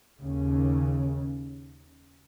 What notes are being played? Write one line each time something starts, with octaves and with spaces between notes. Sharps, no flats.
D#2 C#3